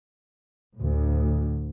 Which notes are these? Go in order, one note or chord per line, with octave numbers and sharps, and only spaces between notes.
D2 A2